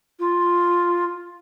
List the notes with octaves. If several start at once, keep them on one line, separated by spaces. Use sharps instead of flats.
F4